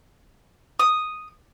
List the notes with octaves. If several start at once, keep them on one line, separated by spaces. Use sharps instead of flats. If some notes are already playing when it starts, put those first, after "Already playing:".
D#6